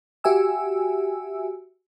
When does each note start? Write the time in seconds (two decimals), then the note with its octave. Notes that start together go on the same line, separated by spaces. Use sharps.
0.24 F#4 G4 E5 G#5 E6